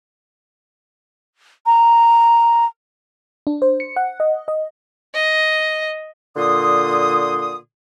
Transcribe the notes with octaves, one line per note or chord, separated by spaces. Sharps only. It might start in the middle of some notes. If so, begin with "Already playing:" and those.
A#5
D4
C5
C#7
F#5
D#5
D#5
D#5
A#2 D3 C6 D#6